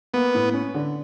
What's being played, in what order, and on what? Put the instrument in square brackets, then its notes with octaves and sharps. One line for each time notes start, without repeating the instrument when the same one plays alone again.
[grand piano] A#3 [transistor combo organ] B3
[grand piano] A2
C#4
D3